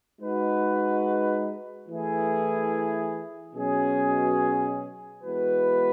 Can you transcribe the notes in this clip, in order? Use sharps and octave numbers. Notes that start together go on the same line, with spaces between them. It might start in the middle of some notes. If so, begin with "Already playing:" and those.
G#3 D#4 F#4 B4
E3 A3 E4 G#4
B2 F#3 C#4 G#4
E3 G#3 B3 F#4 B4